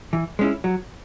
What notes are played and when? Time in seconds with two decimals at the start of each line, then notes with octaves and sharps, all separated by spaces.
0.13 E3
0.39 G#3 C#4 E4
0.64 F#3